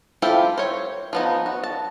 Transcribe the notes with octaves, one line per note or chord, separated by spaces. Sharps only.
E4 F4 G4 A4 C5
C5 C#5
F3 B3 D#4
F#4
A5